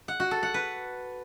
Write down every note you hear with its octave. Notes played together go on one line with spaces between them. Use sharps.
F#5
F#4
A4
F#5
B4